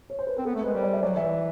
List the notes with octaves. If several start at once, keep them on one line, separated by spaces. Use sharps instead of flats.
C#5
C5
B4
C4 A#4
B3 A4
A3 A#4
G#3 B4
G3 C5
D5
E5
F#3 D5
E3 E5